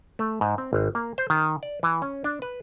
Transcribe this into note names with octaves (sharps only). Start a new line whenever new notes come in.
A3
G#2
C4
G#1
A#3
C5
D#3
D5
E3
C#4
D4
B4